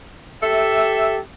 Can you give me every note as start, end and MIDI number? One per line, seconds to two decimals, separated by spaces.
0.42 1.18 67
0.42 1.18 69
0.42 1.18 76